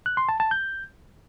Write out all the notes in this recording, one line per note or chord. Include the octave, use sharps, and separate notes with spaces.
F#6
C6
A5
A5
G6